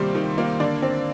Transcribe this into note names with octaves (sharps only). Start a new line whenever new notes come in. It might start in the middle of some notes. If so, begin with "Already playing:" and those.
Already playing: C3 D#3 G3 A#3 C5
D#3
A#3
D3 D5
C4